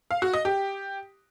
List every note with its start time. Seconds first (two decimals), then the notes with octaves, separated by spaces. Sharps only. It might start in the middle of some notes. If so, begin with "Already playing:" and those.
0.11 F5
0.22 F#4
0.33 D#5
0.45 G4